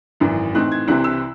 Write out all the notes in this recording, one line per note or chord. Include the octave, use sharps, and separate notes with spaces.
G#1 F#2 E3
A2 E3 C4 D#4 F#6
G#6
C2 C3 E3 C4 E4 F#6
E6